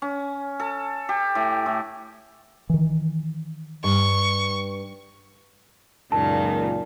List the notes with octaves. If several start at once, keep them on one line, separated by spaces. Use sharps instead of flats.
C#4
A4
G4
A2
A2
D#3 E3
G2 C#6
C#2 F#2 A#2 D#3 A5